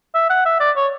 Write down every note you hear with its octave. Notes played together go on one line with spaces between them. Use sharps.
E5
F#5
E5
D5
C#5